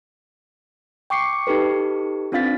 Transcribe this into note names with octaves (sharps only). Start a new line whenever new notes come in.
G5 C#6 D6 C7 C#7
D#4 G4 A4 B4
C4 D4 F4 F5 A6 B6